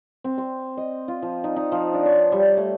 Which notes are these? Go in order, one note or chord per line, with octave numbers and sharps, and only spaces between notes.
C4
C6
D#5
F4
F3
D#4
D#4
F3
D4
C#5
G3
A3